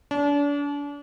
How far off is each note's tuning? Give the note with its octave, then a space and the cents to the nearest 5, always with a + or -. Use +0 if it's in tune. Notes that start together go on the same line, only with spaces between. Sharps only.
D4 -35